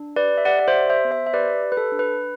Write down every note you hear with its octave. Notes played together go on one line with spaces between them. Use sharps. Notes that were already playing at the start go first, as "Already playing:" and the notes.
Already playing: D4
G4 B4 D5
E5
G4 D5 F#5
D5
C5 E5
G4
C5 E5
B3
C5 E5
E5
G4 B4 D5
G4
B4
A4
D4
B4